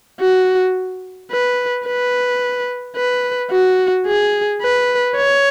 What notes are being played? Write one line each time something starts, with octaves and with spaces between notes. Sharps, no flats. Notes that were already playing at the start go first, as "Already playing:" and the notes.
F#4
B4
B4
B4
F#4
G#4
B4
C#5